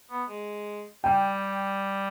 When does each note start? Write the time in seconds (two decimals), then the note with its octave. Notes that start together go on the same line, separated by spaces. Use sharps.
0.11 B3
0.29 G#3
1.04 G3 G5